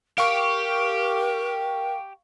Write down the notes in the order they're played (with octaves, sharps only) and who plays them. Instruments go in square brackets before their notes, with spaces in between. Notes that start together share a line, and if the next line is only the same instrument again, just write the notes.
[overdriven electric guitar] G4 [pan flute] A#4 [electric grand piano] F5 C#6 F6